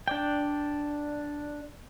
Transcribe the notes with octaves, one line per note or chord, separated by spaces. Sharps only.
D4 D5 G5